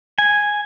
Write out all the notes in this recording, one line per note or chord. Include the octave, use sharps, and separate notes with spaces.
G#5